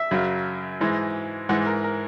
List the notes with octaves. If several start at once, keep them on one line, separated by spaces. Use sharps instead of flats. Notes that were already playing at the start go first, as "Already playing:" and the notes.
Already playing: E5
F#2 C#3 F#3
G#2 E3 G#3
G#2 E3 G#3 F#5
A#4
A#4